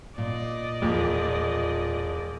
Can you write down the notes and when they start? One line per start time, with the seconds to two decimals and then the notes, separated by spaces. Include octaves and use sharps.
0.18 A#2 D5 D#5
0.82 E1 F2